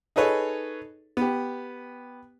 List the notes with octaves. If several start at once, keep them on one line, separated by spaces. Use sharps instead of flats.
D#4 G#4 A4 B4 C#5
B3 G4